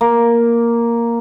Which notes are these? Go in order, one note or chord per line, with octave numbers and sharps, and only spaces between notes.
A#3